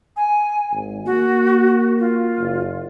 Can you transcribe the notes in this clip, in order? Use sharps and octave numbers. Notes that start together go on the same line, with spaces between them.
G#5
G#1
A#3 F#4
F4
F#1